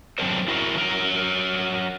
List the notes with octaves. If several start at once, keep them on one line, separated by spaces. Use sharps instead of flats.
F#3 C4 D4 A#4 C5
E4 F#4 A#4
F#3 A#4